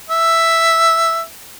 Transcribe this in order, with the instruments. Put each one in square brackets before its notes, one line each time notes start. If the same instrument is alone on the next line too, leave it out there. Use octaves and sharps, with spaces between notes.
[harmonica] E5